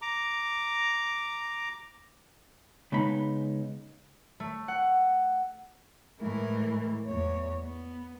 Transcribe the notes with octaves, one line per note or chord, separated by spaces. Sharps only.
A#5 D6
C#3 G#3 B3 D#4 B5
A3
F#5
A2 E3 G#3 A3 E4 A#4
E2 C#5
B3